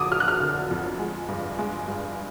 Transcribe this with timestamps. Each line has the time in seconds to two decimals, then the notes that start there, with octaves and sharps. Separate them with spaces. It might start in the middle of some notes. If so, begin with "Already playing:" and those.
Already playing: F2 D3 F#3 D6 D#6
0.12 F#3 F6
0.20 F#6
0.28 F6
0.41 D3
0.71 F2
0.99 G#3
1.28 G2
1.59 G#3
1.87 G2